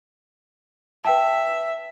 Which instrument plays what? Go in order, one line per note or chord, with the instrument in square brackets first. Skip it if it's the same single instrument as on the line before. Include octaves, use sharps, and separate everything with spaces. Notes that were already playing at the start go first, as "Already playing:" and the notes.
[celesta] B4 G5 A5 [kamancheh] E5